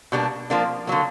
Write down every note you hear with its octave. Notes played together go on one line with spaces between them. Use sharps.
B2 G3 A#3 D4
F3 A#3 D4
D3 F#3 A#3